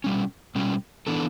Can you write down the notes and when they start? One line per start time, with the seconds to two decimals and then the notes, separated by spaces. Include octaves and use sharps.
0.04 B2 G3 C#4
0.55 B2 G3 C#4
1.07 E3 B3 D4 A4